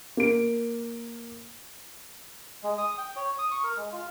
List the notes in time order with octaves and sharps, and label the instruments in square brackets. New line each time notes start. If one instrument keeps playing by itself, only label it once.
[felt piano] A#3 D7
[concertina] G#3
D#6
G5
C#5
D#6
C#6
A#4
G#3
F4